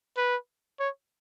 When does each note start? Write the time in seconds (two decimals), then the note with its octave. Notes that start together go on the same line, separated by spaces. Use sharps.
0.17 B4
0.80 C#5